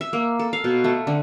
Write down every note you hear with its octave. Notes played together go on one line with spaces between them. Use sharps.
E5
A#3
A4
F5
B2
A3
D3